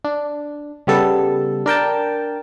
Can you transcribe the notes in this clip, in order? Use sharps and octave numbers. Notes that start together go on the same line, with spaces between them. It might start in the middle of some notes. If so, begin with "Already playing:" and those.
D4
C#3 G3 B3 A4
D4 A#4 G5 A5